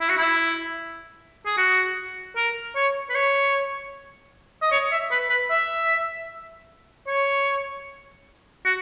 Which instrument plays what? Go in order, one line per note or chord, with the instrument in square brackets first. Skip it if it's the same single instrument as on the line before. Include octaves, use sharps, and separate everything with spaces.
[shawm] E4
F#4
E4
G#4
F#4
A#4
C#5
B4
C#5
D#5
C#5
E5
B4
B4
E5
C#5
F#4